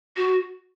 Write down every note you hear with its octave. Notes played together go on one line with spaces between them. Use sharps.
F#4